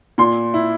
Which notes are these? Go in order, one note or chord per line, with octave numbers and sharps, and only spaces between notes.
A#2 C6
E4